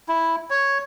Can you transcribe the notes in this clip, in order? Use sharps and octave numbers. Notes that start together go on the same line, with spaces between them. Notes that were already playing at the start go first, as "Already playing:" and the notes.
E4
C#5